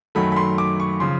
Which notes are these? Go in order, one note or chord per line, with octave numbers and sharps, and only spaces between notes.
F#2 D#3 F#3 A3 B5
B5
C6
D6
C#6
C#3 F3 C6